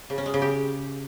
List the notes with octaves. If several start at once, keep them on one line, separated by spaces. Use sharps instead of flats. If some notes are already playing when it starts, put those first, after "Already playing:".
C#3
C#4
G#3
C#3
G4